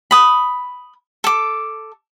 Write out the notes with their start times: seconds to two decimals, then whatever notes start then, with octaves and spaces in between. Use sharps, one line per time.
0.11 B5 D#6
1.24 A4 D6